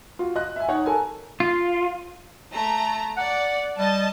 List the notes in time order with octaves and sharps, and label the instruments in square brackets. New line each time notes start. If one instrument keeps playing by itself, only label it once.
[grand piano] F4 F#4
D#5 F#6
E5 G#5
D#4 C#5 F#5
A4 A#4 G#5
[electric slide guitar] F4
[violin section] A3 A#5
[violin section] D5 [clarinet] F#5
[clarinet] G3 [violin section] D#5 A5